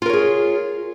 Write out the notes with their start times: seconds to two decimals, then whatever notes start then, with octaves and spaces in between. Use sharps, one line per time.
0.02 F4
0.06 A#4
0.10 C#5
0.13 G#4